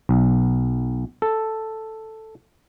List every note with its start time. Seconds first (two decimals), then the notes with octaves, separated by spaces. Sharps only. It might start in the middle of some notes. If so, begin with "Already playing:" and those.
0.09 B1
1.22 A4